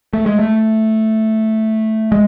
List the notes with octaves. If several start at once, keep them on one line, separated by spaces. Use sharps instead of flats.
A3
G#3
A3
G#3